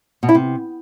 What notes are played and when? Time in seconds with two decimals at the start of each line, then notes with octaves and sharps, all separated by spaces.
0.23 B2
0.29 E4
0.35 C3